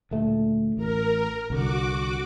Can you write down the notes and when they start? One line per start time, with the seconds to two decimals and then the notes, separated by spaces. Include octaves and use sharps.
0.11 D2 A#2 A3
0.77 A1 A#4
1.50 C2 D3 F#4 D6